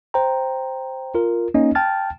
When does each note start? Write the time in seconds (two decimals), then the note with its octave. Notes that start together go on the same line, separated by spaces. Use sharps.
0.14 C5 G5 A#5
1.15 F4 A#4
1.54 A#3 C#4 D#4 D#5
1.75 G5 A5 F6 A6